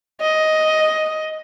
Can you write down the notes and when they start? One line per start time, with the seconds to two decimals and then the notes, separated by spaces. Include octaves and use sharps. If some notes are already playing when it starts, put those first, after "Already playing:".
0.21 D#5